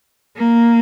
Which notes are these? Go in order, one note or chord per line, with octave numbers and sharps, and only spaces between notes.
A#3